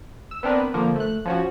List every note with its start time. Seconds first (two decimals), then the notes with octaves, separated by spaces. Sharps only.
0.31 E6
0.43 B3 C4 D4 A#4 B4
0.74 D3 F3 A#3
0.96 A3 F#6
1.25 F3 C#4 F#4